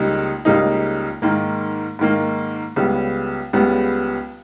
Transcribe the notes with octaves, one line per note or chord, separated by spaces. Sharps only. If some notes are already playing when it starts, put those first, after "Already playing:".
Already playing: C#2 C#3 G3 A#3 D#4
C#2 C#3 G3 A#3 D#4
G#2 D#3 A#3
G#2 D#3 A#3
C#2 C#3 G3 B3
C#2 C#3 G3 B3